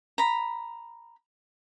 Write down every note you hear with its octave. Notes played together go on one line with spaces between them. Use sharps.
A#5 B5